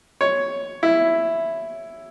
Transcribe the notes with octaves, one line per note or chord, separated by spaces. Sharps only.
C#5
E4